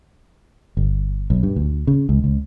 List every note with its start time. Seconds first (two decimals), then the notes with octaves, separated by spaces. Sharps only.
0.77 G1
1.30 B1
1.43 G2
1.56 D2
1.87 C#3
2.09 C#2
2.24 C#2